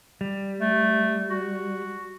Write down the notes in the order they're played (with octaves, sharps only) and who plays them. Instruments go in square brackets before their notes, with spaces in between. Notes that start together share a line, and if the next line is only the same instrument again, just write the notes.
[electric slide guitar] G3
[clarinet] A3
F#4